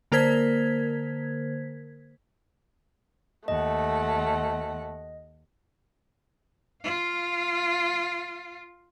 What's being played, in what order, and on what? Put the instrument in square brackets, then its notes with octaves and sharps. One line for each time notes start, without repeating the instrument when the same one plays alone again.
[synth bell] D3 A#3 A#4 C5 G#6 B6
[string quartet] D#2 F#5 [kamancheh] A3 [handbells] D#5
[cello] F4 F5